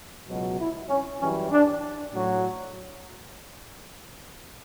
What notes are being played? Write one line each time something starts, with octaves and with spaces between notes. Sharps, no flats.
C#2 B2 F#3
E4
C#4
F#2 E3 G3 C#4
D4
A2 F#3